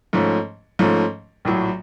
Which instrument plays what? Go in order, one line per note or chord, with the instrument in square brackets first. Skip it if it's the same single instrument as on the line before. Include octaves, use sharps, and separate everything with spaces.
[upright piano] G#2 F3 A3 C#4
G#2 F3 A3 C#4
A#1 A2 F#3